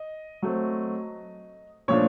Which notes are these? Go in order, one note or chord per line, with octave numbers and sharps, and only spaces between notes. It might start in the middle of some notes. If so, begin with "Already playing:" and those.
Already playing: D#5
F#3 A3 C4
A#2 F3 A3 D4 C#5